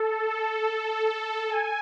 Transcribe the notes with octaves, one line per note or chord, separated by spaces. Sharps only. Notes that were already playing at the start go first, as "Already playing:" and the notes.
Already playing: A4
A4
G#5